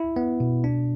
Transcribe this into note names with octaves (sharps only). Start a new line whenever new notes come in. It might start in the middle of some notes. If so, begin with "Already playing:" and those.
Already playing: E4
B3
B2
D4